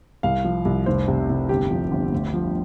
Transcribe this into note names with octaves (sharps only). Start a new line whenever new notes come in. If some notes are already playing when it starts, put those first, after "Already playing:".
C2 F5
F3
C2
F1 C5
C3
F1
G1 G4
F3
G1
D2
F3